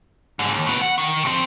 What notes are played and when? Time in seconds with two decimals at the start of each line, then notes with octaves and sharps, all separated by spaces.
0.39 G#2 D3
0.54 D#2
0.67 A2 B3
0.81 F#5
0.98 D#3
1.25 F2 C4